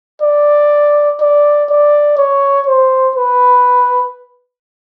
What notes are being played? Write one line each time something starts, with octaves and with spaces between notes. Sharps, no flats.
D5
D5
D5
C#5
C5
B4